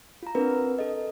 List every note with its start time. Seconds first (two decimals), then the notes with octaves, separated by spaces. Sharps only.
0.23 F4 A#5
0.35 C4 D4 A#4 B4
0.79 A4 D#5